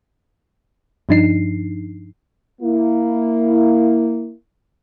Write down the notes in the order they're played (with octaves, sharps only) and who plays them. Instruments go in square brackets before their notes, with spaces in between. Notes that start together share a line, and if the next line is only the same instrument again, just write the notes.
[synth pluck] G2 F3 D4 D#4 C7
[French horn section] A#3 E4